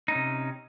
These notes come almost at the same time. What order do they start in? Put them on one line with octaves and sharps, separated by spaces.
D#4 C#4 C3